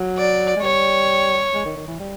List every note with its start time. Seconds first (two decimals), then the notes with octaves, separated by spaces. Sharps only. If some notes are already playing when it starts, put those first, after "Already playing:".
Already playing: F#3
0.18 D5
0.56 G#3
0.62 G3 C#5
1.54 G#3
1.65 D#3
1.76 D#3
1.87 E3
1.99 G3